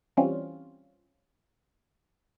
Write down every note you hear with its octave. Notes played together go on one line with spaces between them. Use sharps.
E3 G3 C4 C#4 F4